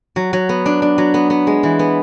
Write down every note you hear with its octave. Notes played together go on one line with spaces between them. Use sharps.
F#3
F#3
B3
D4
D4
F#3
B3
B3
G#3
E3
B3